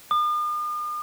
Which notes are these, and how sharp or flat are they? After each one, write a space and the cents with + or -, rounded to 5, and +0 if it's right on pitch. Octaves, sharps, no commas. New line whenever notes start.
D#6 -45